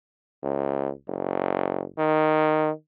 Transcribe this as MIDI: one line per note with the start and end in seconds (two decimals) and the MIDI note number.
0.43 0.90 37
1.08 1.85 30
1.98 2.71 51